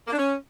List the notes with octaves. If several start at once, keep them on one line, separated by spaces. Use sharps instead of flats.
A#3
D4
C#4